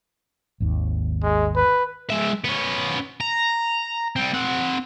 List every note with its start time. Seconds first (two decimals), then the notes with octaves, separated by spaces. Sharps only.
0.60 G#1 D#2
1.23 G#3
1.56 B4
2.10 G#3 E5
2.44 B3 C#4
3.20 A#5
4.16 G3 C4
4.34 C4 F#5